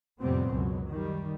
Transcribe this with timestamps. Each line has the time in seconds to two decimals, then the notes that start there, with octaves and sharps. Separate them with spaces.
0.20 F2 A2 C3 G3 B3 C4
0.51 C#2 F#2 B2 F#3
0.89 D#3 G3